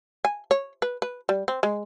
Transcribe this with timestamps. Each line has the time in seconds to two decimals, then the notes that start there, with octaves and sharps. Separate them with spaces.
0.25 G#5
0.51 C#5
0.82 B4
1.02 B4
1.29 G3
1.48 C4
1.63 G#3